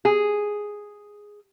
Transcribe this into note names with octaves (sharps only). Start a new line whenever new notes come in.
G#4